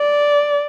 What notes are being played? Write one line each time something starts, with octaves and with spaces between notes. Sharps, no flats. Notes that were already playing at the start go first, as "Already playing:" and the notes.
Already playing: D5